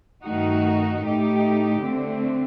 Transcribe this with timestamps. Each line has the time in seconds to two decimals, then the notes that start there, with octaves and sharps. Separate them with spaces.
0.24 G2 D#3 A3 D#4 F#4
1.03 A2 A3 D#4 G4
1.82 D3 A3 C4